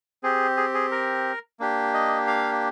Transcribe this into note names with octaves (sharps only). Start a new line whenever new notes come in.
C4 G4 G#4
G#4
G#4
A#4
A#3 D4 G4
D#5
F5